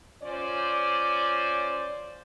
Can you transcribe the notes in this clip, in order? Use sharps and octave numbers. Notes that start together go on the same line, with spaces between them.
C#4 F4 C5 D5